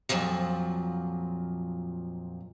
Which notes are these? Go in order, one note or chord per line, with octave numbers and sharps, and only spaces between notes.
F2 A#2 F3 F#3